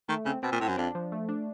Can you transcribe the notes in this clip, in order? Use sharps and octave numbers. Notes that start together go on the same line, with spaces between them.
D#3 A3
C#3 C4
B2 C4
A#2
A2 C4
F#2
F2 D4
F3
A3
D4